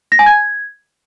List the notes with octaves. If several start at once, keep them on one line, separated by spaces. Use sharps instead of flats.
A#6
G#5
G#6